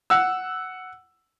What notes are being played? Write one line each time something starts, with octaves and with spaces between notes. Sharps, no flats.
F#5 E6